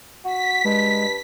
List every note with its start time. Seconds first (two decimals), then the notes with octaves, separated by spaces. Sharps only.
0.25 F#4 B6
0.64 G2 G#3